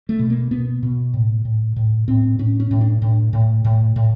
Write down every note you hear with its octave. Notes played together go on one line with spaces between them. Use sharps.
A3
B2
A#3
B2 B3
B2
A2
A2
A2
A2 C4
A2 C#4
C#4
A2
D4
A2
A2
A2
A2